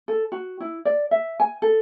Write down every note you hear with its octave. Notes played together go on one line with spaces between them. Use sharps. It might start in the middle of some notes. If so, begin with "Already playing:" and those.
A4
F#4
E4
D5
E5
G#5
A4